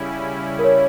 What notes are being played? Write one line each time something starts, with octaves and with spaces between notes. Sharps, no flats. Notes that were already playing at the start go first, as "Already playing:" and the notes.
Already playing: C#3 G3 C#4 E4
A#4
C#5